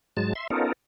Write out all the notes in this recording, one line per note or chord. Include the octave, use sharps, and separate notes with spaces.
G#2 F#3 G#3 A5
E5 C6
B3 C#4 D#4 F4 A4 A#4